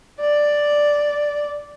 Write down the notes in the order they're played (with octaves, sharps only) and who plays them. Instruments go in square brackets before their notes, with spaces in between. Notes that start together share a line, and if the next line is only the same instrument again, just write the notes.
[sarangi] D5